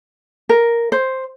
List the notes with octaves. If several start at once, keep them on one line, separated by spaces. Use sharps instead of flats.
A#4
C5